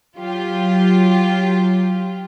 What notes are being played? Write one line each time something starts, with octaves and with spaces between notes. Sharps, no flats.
F#3 F4 G4